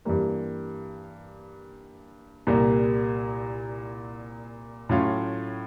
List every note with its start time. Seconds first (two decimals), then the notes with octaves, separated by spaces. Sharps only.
0.05 G2 E3 G3 A#3
2.47 C2 A#2 G3 A#3
4.89 A2 F#3 A3 C#4 F4